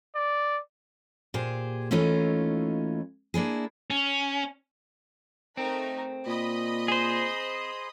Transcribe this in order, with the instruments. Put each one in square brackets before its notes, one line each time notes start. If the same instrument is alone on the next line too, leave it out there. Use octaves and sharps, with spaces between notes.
[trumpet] D5
[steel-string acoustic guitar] A#2 G4 G#4 C5
D#2 E3 A3 C#4 D#4 F4
A#3 D4 E4 G#4
[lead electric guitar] C#4
[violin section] A3 D#4 A#4 [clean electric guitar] C4
[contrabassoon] A#2 [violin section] D#5 B5 D#6
[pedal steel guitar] G#4 C5